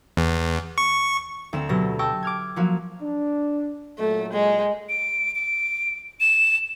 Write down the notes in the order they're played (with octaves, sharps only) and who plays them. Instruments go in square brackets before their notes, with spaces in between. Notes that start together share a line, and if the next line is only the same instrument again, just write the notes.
[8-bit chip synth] E2
C#6
[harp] D2 C4 E7
B2 F#3 G4 A4 A#6
G5 A5 C#6 E6 A#6
D6 F6 G#6
F3 F#3 A#3 F#4 F5
[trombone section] D4
[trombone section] A#2 F#3 [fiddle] A3
[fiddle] G#3
[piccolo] D7
D7
E7